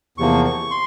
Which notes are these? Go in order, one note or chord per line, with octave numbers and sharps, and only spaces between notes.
E2 C3 F3 A#3 C#6
C#6
C6